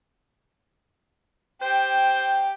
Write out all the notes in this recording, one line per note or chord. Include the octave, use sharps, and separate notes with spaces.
G4 C5 G5